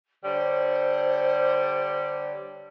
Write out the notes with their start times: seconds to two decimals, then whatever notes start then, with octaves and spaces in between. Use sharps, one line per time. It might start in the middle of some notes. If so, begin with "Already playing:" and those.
0.24 D3 G3 C5 C#5